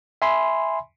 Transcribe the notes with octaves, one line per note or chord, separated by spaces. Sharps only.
E5 G#5 B5 C6